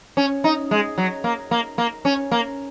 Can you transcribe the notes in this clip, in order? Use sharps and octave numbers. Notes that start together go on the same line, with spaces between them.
C#4
D#4
G#3
F#3
A#3
A#3
A#3
C#4
A#3